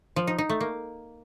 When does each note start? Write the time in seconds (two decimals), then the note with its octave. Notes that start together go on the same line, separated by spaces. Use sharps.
0.16 F3
0.27 D#4
0.38 D#4
0.49 A3
0.61 A#3